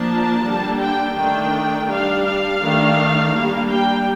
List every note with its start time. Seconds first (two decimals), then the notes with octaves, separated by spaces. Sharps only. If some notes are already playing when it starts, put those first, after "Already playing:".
Already playing: F3 A#3 D4 A5
0.43 D3 G3 A#3 D4
0.79 G5
1.15 D#3 A3 D4 G5
1.88 G3 D4 F5
2.25 F5
2.61 D#3 A3 D4
3.34 G3 A#3 D4
3.70 G5